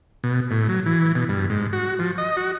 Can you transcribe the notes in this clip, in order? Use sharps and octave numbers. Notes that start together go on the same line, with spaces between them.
B2
A2
F#3
E3
B2
G2
G#2
F#4
F3
D#5
F#4